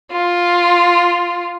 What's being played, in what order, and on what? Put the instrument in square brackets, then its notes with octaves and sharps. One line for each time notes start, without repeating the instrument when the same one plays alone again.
[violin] F4